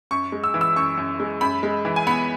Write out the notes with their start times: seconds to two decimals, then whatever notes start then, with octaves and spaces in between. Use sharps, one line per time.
0.11 F#2 C#6
0.32 G#3
0.44 E6
0.54 E3
0.61 E6
0.76 F#2 C#6
0.98 F#2
1.20 G#3
1.41 F#2 B5
1.63 G#3
1.85 E3
1.96 G#5
2.07 B3 B5